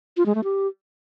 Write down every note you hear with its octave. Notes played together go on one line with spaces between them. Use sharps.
F4
G#3
A3
G4